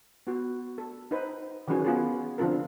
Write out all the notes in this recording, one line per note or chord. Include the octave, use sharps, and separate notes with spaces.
B3 F#4
A4
D#4 B4 C5
D#3 E3 F#3 C#4 F#4 G#4
B3 F4 G#4
D3 F3 C4 F4 A4 A#4